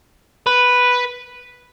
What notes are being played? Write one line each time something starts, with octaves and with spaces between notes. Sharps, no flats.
B4